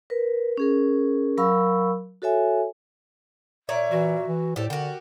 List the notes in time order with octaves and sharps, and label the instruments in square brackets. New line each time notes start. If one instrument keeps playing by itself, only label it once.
[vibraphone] A#4 B4
C#4 G#4 A#4
F#3 A#4 F5 B5 C#6 E6
F#4 A4 C#5 E5 G#5
[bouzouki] A#2 C#5 D5 [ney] E5
[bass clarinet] E3 [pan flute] F#4
[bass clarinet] E3
[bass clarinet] A2 [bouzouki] G4 A4 [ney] C5 [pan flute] D5
[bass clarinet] D3 [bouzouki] F#4 G4 [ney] A#4